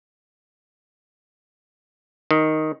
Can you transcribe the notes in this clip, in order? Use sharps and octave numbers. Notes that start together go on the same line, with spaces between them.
D#3